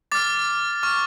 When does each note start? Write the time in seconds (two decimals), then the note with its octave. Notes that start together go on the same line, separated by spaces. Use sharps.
0.12 D6 F6 A6
0.83 C#6 F6